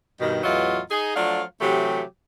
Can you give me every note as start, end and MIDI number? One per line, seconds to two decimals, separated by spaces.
0.20 0.41 43
0.20 0.41 47
0.20 0.41 51
0.43 0.80 40
0.43 0.80 45
0.43 0.80 52
0.43 0.80 54
0.43 0.80 65
0.43 0.80 75
0.91 1.13 63
0.91 1.13 68
1.15 1.42 53
1.15 1.42 54
1.15 1.42 57
1.15 1.42 62
1.15 1.42 65
1.15 1.42 77
1.60 2.02 48
1.60 2.02 52
1.60 2.02 54
1.60 2.02 57
1.60 2.02 67